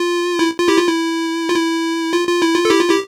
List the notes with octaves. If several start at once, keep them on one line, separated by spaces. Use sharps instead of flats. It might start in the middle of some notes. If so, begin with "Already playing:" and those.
Already playing: F4
E4
F4
E4 G4
F4
E4
F4
E4
F4
F4
E4
F4
A4
E4 G4
F4
E4 G4